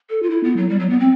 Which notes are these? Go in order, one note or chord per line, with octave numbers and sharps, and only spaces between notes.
A4
F4
E4
B3
F#3
G3
F#3
B3
C4